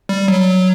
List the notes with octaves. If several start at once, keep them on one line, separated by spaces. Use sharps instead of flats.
G3
F#3